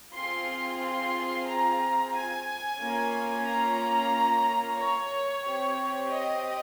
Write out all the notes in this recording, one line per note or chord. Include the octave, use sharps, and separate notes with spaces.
C4 F4 G#4 C6
C6
A#5
G#5
A#3 C#4 F4
A#5
C#5
C4 G4
D#5